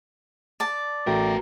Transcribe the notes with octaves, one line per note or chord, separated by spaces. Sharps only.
D5 A5
A1 A3 B3 F#4 A#4 G5